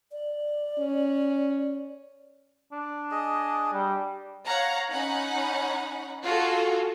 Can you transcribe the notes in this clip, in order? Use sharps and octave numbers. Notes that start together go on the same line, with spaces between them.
D5
C#4
D4
G#4 D#5
G3
C#5 F5 F#5 A#5
C#4 D#4 F#5 B5
F4 F#4 G#4 A4